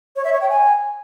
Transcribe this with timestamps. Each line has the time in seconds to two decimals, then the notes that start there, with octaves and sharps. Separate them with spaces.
0.16 C#5
0.24 E5
0.33 C#5
0.41 G5
0.49 G#5